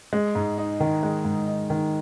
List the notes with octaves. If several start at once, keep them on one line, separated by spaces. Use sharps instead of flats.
G#3
G#2
D#4
D#3
G#3
G#2
D#4
D#3